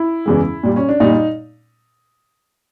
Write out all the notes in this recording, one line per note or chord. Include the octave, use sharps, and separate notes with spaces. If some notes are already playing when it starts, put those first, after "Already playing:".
Already playing: E4
E2 C#3 E3 G#3
A#2 G3
C#4
D4
A#2 G3 D#4